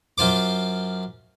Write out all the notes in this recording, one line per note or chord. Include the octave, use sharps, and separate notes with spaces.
F#2 F4 C5 D6